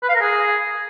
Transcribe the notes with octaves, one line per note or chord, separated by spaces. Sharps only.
B4
F5
A#4
G#4